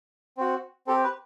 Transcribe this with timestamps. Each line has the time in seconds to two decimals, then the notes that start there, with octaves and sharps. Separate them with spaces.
0.37 C4 F#4
0.87 C4 G4 A4
1.04 B4